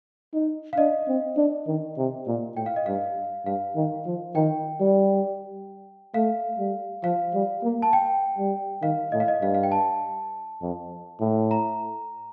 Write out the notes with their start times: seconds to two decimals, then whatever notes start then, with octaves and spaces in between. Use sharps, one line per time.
0.33 D#4
0.73 F5
0.77 D4 D#5
1.08 C4
1.37 D4
1.67 D#3
1.97 C3
2.27 A#2
2.56 A2 G5
2.66 F5
2.76 D#5
2.86 G2 F5
3.45 G2 F5
3.75 D#3
4.06 F3
4.35 D#3 G5
4.80 G3
6.14 A3 F5
6.59 G3
7.03 F3 F5
7.34 G3
7.63 A#3
7.82 A5
7.93 G5
8.38 G3
8.82 D#3 F5
9.12 A2 D#5
9.20 F5
9.28 D#5
9.42 G2 F5
9.54 F5
9.63 G5
9.72 A5
10.62 F2
11.20 A2
11.51 A#5